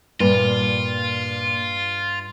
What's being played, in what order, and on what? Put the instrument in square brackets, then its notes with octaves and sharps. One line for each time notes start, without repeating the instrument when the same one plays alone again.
[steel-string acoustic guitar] G2 [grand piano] A#2 [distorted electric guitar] F4